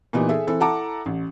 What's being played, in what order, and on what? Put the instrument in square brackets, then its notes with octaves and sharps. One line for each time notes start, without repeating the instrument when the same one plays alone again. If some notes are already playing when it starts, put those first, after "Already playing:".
[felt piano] A#2 E3 B3 D#4 G4
G#4 A4 E5
E3 C4 E4 A4
E4 A4 F#5 A5 A#5 D6
A1